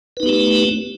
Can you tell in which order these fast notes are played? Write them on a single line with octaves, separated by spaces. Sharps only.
B4 D#4 B3 G4 A3